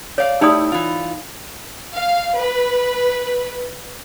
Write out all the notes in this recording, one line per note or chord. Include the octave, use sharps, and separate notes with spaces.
C#5 D5 F5
A3 D#4 E4 G4 D5 D#6
E3 F4
F5
B4